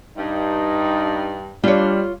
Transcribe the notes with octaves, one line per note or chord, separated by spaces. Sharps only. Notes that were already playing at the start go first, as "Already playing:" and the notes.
G2 D#4
G3 D4 F4 C#5